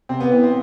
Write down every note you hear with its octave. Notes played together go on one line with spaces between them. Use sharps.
C3 C4
B3
E3 B3
C4